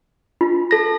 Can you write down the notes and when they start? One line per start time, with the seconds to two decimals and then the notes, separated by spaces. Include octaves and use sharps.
0.41 F4
0.71 A4 A#6